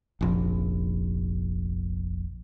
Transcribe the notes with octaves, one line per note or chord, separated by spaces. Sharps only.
F1 A#1